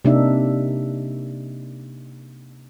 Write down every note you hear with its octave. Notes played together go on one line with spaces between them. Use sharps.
C3 A#3 D4 D#4 D5 E5